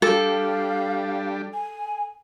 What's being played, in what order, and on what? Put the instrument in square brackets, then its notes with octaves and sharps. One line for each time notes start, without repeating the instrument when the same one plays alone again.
[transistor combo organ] G3 D4 [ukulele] A4 [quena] F5
[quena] G#5